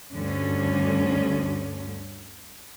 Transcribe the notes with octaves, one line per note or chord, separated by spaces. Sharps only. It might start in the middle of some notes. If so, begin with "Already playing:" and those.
D2 G2 D3 C#4